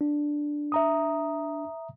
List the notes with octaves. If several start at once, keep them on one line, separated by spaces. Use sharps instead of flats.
D4
E5 A#5 D#6